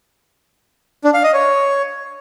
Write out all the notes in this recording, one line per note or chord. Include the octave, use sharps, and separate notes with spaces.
D4
F5
D#5
C#5